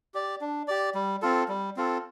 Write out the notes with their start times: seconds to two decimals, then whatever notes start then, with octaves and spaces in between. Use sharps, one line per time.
0.14 G4 D5
0.41 D4
0.68 G4 D5
0.95 G3
1.22 C4 F4 A4
1.48 G3
1.76 C4 F4 A4